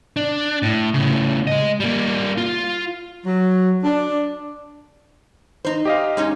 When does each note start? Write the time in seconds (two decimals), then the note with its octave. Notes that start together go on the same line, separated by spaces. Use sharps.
0.16 D4
0.62 A2
0.94 A2 C#3
1.47 G#3 D#5
1.80 G3 A#3
2.38 F4
3.26 F#3
3.84 D4
5.65 D#4 C5
5.85 G4 D#5 F5
6.17 G#3 C#4 D#4